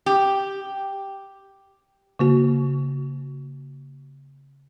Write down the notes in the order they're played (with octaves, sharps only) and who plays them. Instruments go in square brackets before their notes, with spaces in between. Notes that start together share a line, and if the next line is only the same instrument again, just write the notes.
[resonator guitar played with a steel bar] G4
[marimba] C#3 A#3 F#4